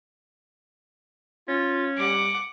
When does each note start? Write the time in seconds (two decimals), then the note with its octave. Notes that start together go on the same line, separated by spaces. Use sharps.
1.48 C#4 F4
1.97 G3 F#5 D6